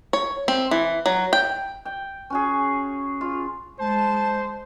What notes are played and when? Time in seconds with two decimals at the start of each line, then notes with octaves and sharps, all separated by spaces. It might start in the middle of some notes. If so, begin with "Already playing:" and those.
0.13 C#5
0.48 C4
0.71 E3
1.06 F#3
1.33 G5
1.85 G5
2.30 C#4 F#4 G#4
3.21 F4
3.79 G#3 C5 A5